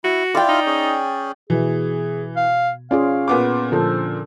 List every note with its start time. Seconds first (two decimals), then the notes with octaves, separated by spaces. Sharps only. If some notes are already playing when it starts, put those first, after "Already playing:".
0.04 E4 F#4
0.35 E4 F4 D5 F5 G5
0.49 D#4
0.66 C#4 G#4
1.50 B2 E3 G#4
2.37 F5
2.91 C#4 F4 G#4 D5 F5
3.28 A#2 B3 D6
3.72 A#2 D3 F3 A4 C5